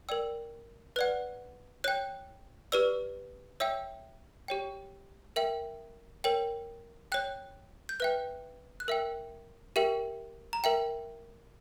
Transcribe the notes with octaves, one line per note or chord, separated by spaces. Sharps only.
A#4 D5 G5 E6
B4 D5 F#5 F#6
C#5 G5 F#6
G4 B4 D5 E6
C#5 E5 G5 E6
G4 C#5 G5
A#4 E5 G5
A#4 C#5 G5
C#5 G5 F#6
G6
B4 E5 G5 F#6
F#6
A#4 E5 G5 E6
G4 A#4 E5 G5
A#5
A#4 E5 G5